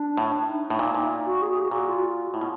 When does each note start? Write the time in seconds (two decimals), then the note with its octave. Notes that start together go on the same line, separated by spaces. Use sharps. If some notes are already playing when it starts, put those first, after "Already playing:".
Already playing: D4
0.18 A2
0.48 D#4
0.70 A2
0.79 A#2
0.95 A#2
1.26 F#4
1.42 G#4
1.52 G#4
1.61 F#4
1.71 A#2 F#4
1.87 F4
2.34 A2 E4
2.41 B2